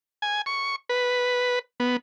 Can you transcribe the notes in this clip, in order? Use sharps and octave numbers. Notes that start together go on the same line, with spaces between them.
G#5
C#6
B4
B3